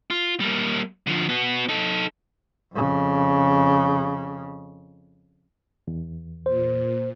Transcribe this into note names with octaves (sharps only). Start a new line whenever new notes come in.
F4
G3 A#3
D3 F3
B3 F#4
D#4 A4
F2 C#3
E2
A#2 C5